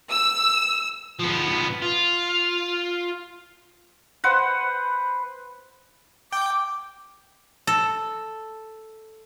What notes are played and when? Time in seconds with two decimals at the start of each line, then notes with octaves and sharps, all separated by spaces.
0.11 E6
1.19 F3 B3
1.82 F4
4.24 B4 C5 F#5
6.32 G5 D6
7.67 A4